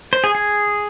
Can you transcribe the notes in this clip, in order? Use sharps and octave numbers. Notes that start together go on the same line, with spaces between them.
C5
G#4
G#4